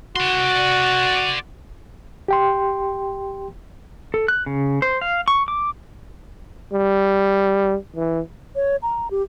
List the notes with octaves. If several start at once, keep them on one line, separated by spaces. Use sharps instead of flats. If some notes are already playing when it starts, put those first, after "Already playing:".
F#4 D5 C6
G4 G5 C6
A4
F#6
C#3
C5
F5
C#6
D6
G3
E3
C#5
A#5
G4